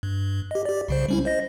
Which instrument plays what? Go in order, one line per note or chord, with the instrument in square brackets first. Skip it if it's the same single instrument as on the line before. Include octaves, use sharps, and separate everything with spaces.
[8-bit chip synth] G2
G4 D#5
G4 D5
C2 C#3 C5
G3 C#4 E4
C5 D#5 A#6